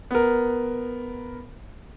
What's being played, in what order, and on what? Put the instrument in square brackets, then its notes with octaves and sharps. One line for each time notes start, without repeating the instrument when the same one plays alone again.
[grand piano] B3 A#4